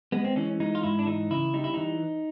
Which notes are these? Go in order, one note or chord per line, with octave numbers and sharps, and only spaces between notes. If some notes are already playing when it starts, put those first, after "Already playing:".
G#3 B3
C4
E3 C#4
G#3 D#4
F4
G#2 E4
D4
E3 D#4
C#3 E4
G3 D#4
E4
E3 D#4